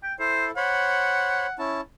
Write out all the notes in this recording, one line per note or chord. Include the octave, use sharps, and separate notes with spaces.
G5
E4 A4 C5
C5 C#5 F#5 B5
C#4 E4 A5